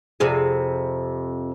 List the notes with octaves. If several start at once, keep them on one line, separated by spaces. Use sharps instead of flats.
F2 C3 G#4